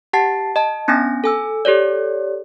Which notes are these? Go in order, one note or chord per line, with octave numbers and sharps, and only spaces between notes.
G4 F#5 A5 A6 C7
D#5 A5
B3 C#4 D4 G#5 A#6
A4 G#5 E6
G4 A4 C#5 D5